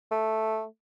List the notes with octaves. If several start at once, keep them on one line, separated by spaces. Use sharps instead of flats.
A3